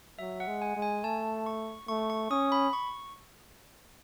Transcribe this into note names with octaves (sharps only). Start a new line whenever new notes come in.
F#3 E5
F#5
G#3
G#5
G#3
G#5
A3 A5
C#6
A3 C#6
C#6
C#4 D#6
B5
C#6